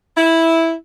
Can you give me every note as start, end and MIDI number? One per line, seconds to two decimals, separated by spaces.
0.17 0.74 64